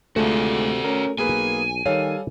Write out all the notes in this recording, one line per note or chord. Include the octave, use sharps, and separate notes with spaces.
D2 C3 G#3 A3 F4 F#4 D5
C#4 A#4
B1 A#3 G#4 B4 G#5
D#3 G3 A4 C#5 F5